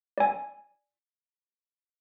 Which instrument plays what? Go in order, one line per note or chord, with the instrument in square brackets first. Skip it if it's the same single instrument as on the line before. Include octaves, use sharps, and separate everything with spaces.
[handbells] D5 G#5